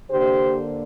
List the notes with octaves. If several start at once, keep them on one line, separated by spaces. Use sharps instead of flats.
D3 A#3 D4 G4 C5